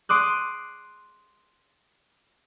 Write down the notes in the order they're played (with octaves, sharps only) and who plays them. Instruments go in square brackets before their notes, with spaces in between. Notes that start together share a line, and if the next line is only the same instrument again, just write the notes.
[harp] C6 D6 D#6 F#6